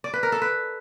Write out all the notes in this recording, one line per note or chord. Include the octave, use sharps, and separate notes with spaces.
D5
B4
A#4
A4
B4